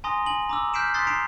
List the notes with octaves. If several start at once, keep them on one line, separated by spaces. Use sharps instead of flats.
G#5 A#5 C6 D#6 A#6
G#5 F#7
A#5 D6 E6
F6 G6 B6 C7 D7 E7
C6 D#6 F#6 A6 B6 C7
A#5 C7 D7 E7